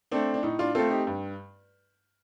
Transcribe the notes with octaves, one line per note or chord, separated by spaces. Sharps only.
A3 C4 D4
D4
A2 D#4
D4 F4
A3 C4 F4 A4
D#4 G4
G2